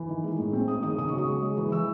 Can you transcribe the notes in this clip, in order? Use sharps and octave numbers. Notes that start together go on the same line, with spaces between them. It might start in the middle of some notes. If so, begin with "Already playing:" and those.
Already playing: E3
D#3
G#3
A2
C4
G#3 D#6
D#3 D#6
C#3 D#6
F#3 C#6
D#6
G#3
G#3
E3 C#6
E3 E6